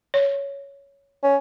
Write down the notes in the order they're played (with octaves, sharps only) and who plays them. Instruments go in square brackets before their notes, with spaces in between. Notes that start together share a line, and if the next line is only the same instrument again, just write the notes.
[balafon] C#5
[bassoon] C#4